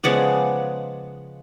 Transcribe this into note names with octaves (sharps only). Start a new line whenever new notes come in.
C#3 F3 G#3 B3 D5 F#5